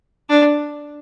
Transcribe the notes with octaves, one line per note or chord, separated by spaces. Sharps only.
D4